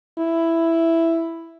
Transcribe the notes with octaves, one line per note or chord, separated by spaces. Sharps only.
E4